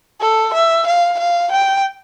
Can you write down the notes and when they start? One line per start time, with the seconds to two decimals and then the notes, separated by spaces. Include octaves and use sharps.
0.21 A4
0.54 E5
0.87 F5
1.19 F5
1.52 G5